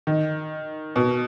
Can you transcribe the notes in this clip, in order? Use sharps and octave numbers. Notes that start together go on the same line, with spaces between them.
D#3
B2